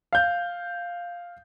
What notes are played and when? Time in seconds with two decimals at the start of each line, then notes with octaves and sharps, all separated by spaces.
0.13 F5 G6